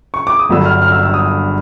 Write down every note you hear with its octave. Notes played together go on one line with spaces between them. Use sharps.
C#6
D6
D#6
G1 G2 D3 F#3 E6
F6
F6
E6
E6
D#6